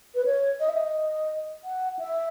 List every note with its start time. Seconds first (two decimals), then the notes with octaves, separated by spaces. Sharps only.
0.15 B4
0.25 C#5
0.60 D#5
0.69 E5
0.77 D#5
1.64 F#5
1.99 E5